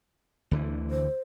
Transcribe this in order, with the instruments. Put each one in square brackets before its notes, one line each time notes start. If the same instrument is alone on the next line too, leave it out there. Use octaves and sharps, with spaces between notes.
[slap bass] D2 D3 E3
[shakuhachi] C5